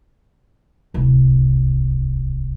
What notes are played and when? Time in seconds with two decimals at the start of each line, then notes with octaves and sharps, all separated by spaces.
0.94 D1 C2